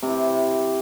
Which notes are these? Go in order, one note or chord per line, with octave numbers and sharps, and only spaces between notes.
C3 E4